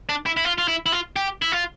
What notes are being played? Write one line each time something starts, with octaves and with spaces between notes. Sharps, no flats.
D4
E4
E4
F4
F4
E4
E4
F4
G4
E4
F4